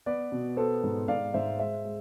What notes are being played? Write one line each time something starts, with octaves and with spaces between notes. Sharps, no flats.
B3 B4 D5
B2
B3 A4 C5
G#2
G#2 D5 F5
G#2 C5 E5
G#3 C5 E5
G#3